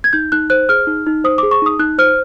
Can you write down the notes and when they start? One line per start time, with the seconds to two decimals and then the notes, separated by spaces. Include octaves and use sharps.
0.04 G#6
0.13 D#4 G6
0.32 D#4 F#6
0.50 C5 F#6
0.69 G#4 F6
0.87 D#4
1.06 D#4
1.24 C5 D#6
1.38 G#4 D6
1.51 C#6
1.62 D#4 D#6
1.79 D#4 F#6
1.98 C5 F6